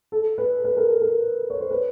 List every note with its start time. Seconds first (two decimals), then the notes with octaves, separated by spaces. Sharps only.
0.12 A4
0.38 B4
0.64 B4
0.77 A#4
0.90 A4
1.01 A#4
1.50 C#5
1.60 C5
1.71 B4